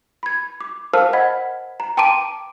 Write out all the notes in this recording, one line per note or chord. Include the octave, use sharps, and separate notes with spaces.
B5 G#6
D6
A#4 C5 F5 A5 E6 F6
D#5 F#5 B5 G#6 B6
A#5
G5 A5 C6 D6 D7 D#7